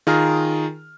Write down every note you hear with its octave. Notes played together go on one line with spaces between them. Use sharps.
D#3 F4 G#4 A#4 A#5 F6